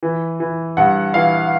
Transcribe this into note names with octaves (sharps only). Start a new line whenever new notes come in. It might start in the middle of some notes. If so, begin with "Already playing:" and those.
E3
E3
G2 F#5
E3 F5